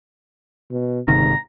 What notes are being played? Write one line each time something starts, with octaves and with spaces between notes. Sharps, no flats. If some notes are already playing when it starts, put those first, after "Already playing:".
B2
G1 G#2 C3 D#3 A#5